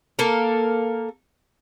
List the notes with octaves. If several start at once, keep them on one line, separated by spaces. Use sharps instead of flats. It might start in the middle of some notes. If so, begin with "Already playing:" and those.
A#3 A4 A#4